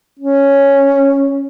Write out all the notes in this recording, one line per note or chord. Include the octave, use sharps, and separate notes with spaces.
C#4